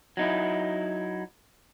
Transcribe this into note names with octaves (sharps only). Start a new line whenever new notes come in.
F#3 D#4 E4